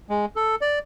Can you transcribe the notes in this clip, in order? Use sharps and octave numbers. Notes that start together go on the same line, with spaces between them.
G#3
A4
D5